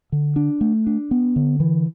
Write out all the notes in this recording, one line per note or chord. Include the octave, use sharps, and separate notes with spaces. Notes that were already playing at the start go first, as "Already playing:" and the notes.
D3
D4
A3
D4
B3
D3
E3